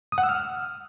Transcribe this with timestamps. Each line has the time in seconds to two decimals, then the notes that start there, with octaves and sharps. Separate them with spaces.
0.12 D#6
0.18 F#5
0.23 E6
0.29 F6